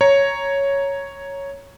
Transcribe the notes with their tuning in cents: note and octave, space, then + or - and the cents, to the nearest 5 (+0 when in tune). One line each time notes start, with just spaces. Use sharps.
C#5 +0 A#5 +0